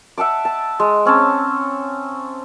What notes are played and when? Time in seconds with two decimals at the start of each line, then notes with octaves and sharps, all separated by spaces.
0.18 E5 F#5 A5 D6
0.45 A5
0.80 G#3
1.06 C4 C#4 C#5 A5